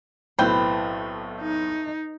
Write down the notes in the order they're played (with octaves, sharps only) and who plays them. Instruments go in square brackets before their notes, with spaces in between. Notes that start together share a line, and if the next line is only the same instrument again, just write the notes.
[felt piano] B1 A2 [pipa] A3 C4 G5 [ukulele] B4 B5
[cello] D#4